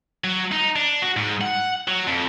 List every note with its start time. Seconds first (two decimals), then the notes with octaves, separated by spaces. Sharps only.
0.24 F#3
0.52 D#4
0.76 D4
1.02 F#4
1.17 G#2
1.41 F#5
1.87 F#3
2.07 F2